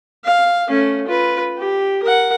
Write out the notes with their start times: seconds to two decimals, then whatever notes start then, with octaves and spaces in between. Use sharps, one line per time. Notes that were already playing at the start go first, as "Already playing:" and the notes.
0.25 F5
0.68 A3 C#4
1.08 F4 B4
1.58 G4
2.03 A#4 F#5